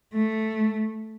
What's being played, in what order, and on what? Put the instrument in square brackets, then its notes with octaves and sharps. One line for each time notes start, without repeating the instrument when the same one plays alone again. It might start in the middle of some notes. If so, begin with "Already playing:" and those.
[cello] A3